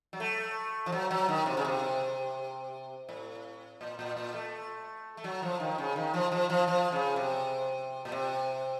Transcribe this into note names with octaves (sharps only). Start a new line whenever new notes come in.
F#3
A3
F3
F#3
F#3
D#3
C3
C#3
C3
A2
A#2
A#2
A#2
A3
A3
F#3
F3
D#3
C#3
D#3
F3
F3
F3
F3
C#3
C3
A#2
C3